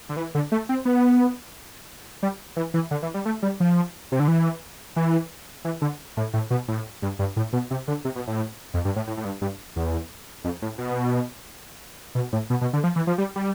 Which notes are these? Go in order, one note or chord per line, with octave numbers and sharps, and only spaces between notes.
D3
E3
D3
A3
C4
B3
G3
E3
E3
D3
E3
G3
A3
G3
F3
C3
D3
E3
E3
E3
D3
A2
A2
B2
A2
G2
G2
A2
B2
C3
D3
C3
B2
A2
F2
G2
A2
A2
A2
G2
G2
E2
F2
A2
B2
B2
A2
B2
B2
D3
F3
E3
F3
G3
G3